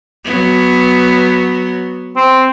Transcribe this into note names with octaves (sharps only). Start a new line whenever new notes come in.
F#3 B3
C4